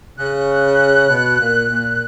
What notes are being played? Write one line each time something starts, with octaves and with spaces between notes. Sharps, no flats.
C#3 F#6
B2
A#2
A#2